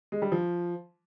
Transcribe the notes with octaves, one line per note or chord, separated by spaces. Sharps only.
G#3
G3
F3